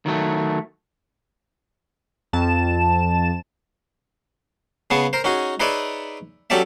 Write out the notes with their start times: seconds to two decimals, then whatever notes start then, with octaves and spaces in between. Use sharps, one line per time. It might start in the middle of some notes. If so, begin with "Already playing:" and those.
0.06 D#3 F#3 A3
2.33 F2 A5 E7
4.90 C#3 B3 G#4 A5 C#6
5.13 A#4 C5
5.24 C#4 D#4 F#4 G#4
5.60 D#4 G#4 B4 C#5 D5 E5
6.50 F#3 C#4 G4 A4 D5 E5